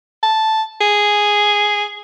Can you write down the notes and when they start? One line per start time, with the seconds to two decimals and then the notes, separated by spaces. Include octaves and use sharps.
0.23 A5
0.81 G#4